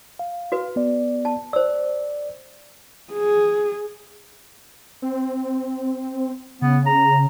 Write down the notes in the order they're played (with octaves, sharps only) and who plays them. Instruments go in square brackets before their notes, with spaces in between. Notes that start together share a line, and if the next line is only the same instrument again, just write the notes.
[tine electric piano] F5
[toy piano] F#4 B4
[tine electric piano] B3 D5
[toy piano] A5
[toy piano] C5 E6 [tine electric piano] D5
[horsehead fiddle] G#4
[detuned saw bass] C4
[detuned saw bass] C#3 [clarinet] B3
[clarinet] A#5